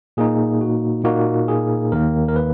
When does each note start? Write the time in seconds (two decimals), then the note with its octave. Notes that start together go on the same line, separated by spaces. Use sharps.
0.17 A#2 A#3 D#4 G#4
0.61 F#4
1.04 A#2 A#3 D#4 F#4
1.48 G#4
1.92 D#2 D#3 A#3 A#4
2.28 A#4
2.36 B4